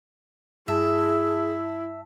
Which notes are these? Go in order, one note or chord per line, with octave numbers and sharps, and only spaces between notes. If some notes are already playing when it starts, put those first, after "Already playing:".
G2 E4 G#4 E5 A5